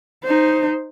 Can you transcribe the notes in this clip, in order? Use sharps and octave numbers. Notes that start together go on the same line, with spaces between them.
D#4 C5